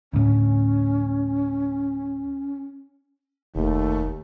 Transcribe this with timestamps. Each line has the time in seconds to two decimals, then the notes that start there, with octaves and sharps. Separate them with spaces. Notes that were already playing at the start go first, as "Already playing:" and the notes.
0.13 D2 A2 C#4
3.56 F1 D#2 A3